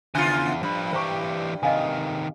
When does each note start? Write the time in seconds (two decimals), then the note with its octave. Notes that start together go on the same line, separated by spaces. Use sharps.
0.15 E2 C#3 F4 G#5
0.63 G2 F3 B5
0.93 E3 G4 C5 A#5 C#6
1.63 C3 D#3 D#5 F5 G#5